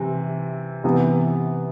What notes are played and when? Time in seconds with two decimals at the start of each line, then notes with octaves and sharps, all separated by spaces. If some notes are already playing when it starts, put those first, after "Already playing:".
Already playing: C3 E3
0.84 C3 E3 B3